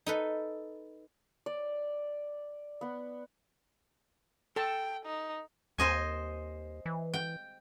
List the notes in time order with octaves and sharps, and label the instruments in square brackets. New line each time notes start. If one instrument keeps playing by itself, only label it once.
[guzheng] D#4 A4 B4
[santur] D5
B3 F#5
[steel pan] A4 A5 [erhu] G5
[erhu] D#4
[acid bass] D#2 [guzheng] C5 D#5 G#5
[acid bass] E3
[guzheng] G5